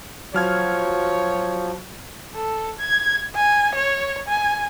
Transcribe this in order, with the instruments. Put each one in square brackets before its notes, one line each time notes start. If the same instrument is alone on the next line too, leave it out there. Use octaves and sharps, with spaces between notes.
[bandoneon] F3 [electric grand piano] F#3 F6 G#6 [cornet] C#5
[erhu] A4
G#6
G#5
C#5
G#5